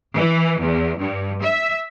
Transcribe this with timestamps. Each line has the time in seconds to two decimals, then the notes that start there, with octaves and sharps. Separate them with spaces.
0.15 E3
0.60 E2
0.99 G2
1.42 E5